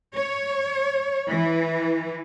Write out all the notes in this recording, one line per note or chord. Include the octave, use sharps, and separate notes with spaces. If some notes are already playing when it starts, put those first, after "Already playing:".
C#5
E3